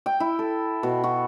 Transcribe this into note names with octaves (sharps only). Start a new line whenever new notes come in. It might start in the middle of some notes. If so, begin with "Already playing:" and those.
G5
E4
A4
B2
F#4